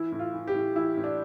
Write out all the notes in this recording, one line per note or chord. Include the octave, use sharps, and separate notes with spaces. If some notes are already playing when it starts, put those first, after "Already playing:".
Already playing: E3 E4
A2
F4
E3
G4
A2
E3 E4
A2
D4